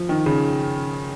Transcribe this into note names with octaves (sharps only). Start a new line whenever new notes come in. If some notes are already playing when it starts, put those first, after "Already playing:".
Already playing: F3
D#3
C#3